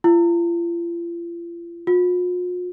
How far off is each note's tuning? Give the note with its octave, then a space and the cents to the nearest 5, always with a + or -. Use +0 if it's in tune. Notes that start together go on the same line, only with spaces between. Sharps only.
F4 -40
F4 +45